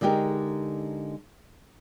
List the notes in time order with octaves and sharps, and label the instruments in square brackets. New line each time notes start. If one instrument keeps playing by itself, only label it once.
[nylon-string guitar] D3 G#3 D#4 G4 A#4